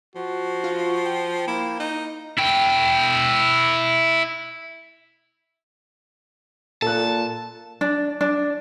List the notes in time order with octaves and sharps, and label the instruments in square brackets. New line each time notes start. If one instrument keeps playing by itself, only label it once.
[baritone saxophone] F3 [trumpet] F#4
[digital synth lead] F4
G5
[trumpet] A#3 [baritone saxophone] E4
[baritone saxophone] D#4
[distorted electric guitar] E4 G5
[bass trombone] A#2 [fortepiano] A4 F#6 [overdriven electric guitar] A5
[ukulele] D4
D4